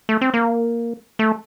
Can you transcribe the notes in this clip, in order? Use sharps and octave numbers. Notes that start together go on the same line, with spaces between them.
A3
C4
A#3
A3